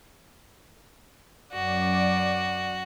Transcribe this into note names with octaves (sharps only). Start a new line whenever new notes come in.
F#2 F#4 D5